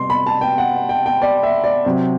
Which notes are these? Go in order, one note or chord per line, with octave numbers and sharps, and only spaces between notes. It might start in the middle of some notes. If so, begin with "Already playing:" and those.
Already playing: C3 G3 B3 C6
B5
A5
G5
F#5
G5
G5
D5
E5
D5
C3 F#3 C4